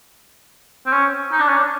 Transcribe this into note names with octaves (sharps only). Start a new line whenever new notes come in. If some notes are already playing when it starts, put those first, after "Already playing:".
C4
C#4
D#4
D4
C#4
D4